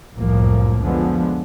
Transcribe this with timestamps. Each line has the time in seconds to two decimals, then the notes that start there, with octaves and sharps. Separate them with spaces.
0.17 F1 C2 F#2 A2 F3 A#3
0.82 D3 F3 G#3 B3